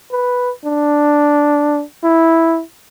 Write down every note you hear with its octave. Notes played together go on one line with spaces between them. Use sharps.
B4
D4
E4